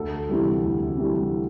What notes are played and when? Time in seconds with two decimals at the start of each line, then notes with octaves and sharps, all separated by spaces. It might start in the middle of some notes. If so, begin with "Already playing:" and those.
Already playing: D2 A4
0.29 C3 E3 G3
0.63 D2
0.98 C3 E3 G3